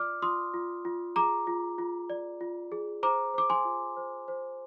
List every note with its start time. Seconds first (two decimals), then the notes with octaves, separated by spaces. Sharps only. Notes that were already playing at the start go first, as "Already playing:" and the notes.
Already playing: F4 D5 D6 F6
0.22 F4 C6 D#6
0.54 F4
0.85 F4
1.16 G#4 A#5 D6
1.47 F4
1.78 F4
2.10 D5
2.41 F4
2.72 G#4
3.03 C5 A#5 D6
3.34 C5 D6
3.50 G#5 C6
3.65 F4
3.97 C5
4.28 C5